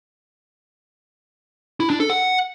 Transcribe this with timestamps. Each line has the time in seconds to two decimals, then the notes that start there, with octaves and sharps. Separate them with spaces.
1.80 E4
1.90 D4
2.00 A4
2.10 F#5